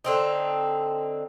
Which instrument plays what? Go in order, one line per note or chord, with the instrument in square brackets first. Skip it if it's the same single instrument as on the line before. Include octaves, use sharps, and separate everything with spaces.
[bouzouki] D3 C4 D#4